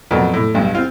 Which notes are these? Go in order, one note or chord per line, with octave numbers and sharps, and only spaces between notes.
F2 A#2 F#3 B3
A2
B1 G2
C4 F4